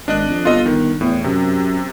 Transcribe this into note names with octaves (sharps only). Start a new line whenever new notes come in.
G#1 D4 D#5 F#6
F2
G1 F4 A4 D#5
D#3
E2 A2
F#2 C3